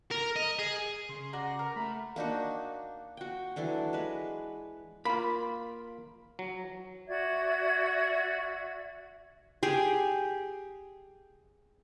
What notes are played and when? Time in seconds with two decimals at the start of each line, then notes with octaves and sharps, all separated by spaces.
0.11 A#4
0.36 D#5
0.59 G#4
1.09 C#3 C6
1.33 F#4 D5 F#5 A#5
1.59 A#4
1.76 A3 B5
2.16 A#3 D4 D#4 F#4
3.17 F#4 G5
3.56 E3 F#3 D4 A4
3.93 G#3 B4
5.05 A#3 F4 B5
6.39 F#3
7.07 F#4 D5 E5 G#6
9.63 G4 G#4